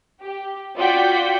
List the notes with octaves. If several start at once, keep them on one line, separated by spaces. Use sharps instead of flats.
G4
F4 F#4 D5 G5 G6 B6